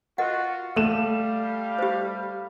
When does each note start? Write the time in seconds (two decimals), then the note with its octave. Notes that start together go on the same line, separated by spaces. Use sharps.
0.18 F4 F#4 A#4 D#5 F#5
0.76 G3 A3 A4 F5 E7
1.79 G4 C5